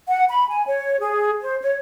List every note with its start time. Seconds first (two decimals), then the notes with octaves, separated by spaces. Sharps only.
0.08 F#5
0.30 B5
0.50 G#5
0.66 C#5
1.00 G#4
1.42 C5
1.61 C#5